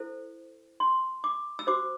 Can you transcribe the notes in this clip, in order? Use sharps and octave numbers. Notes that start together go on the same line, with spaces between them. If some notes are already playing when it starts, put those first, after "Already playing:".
Already playing: E4 A4 C5
C6
D6
E6
F#4 C5 D6